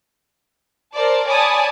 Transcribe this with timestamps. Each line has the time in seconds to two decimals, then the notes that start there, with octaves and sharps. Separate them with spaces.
0.94 A#4 C5 D5 A5
1.26 C#5 D5 G#5 A5 B5 D#6